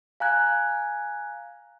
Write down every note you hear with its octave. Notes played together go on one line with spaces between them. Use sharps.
F5 G#5 A#5 F#6 G#6